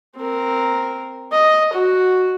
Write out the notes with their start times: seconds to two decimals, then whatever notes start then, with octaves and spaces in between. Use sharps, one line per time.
0.17 C4 A#4
1.32 D#5
1.73 F#4